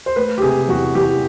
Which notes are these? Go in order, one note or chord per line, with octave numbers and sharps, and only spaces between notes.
C5
A3 B4
G4
C3 G#4
E2 F#4
E3 G4